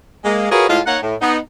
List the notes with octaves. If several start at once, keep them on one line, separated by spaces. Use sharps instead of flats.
G#3 A#3
F4 F#4 G#4 A#4 B4 C#5
A2 G#3 F4
A#3 D#4 C#5 F#5
A2
B3 D#4